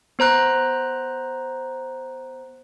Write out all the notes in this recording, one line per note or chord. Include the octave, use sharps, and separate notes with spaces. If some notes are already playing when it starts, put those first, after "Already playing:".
B3 C5 A#5 F#6